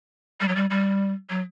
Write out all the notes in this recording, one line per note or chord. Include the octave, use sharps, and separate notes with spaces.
G3
F#3
G3
G3
F#3